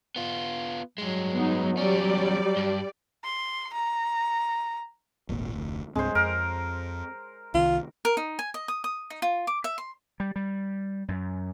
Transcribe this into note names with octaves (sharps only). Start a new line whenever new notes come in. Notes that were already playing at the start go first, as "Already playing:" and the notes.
B3 F4
G2 F#3 G#3
B3 D#4
E2 G3 C#4 D5
G2
C6
A#5
D#1 G#1 A#2
F1 D2
C2 G2 G#3 C4 C5
F2 A#4
C2 D#3 F4
A#4
D#4
G#5
D#5
D#6
D#6
D#4
F4
D6
E5
C6
G3
G3
F#2